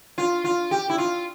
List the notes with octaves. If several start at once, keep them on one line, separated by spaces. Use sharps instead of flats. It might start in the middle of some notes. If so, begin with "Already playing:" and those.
F4
F4
G4
E4
F4